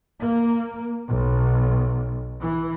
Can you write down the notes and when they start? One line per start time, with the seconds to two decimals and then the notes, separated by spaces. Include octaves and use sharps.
0.20 A#3
1.08 B1
2.41 E3